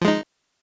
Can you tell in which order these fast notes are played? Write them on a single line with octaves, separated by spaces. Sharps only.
F3 G#3 D#4